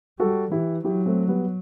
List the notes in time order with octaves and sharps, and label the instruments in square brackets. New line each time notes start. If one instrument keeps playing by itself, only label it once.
[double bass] G3 [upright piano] F#4 A4
[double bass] E3 [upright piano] E4 G4
[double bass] F#3 [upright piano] E4 G4
[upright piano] A3 C4
G3 B3